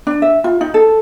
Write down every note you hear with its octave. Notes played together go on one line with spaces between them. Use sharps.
D4
E5
F4
D#4
A4